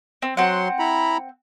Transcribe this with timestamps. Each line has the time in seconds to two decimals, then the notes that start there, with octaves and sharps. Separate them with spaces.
0.22 C4
0.37 F#3 C4 F#5 C6
0.79 E4 A#5 B5